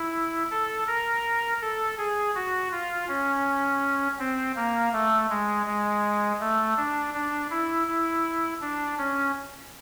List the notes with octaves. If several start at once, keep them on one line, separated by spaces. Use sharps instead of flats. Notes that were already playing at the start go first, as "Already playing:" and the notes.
Already playing: E4
A4
A#4
A4
G#4
F#4
F4
C#4
C4
A#3
A3
G#3
G#3
A3
D4
D4
E4
E4
D4
C#4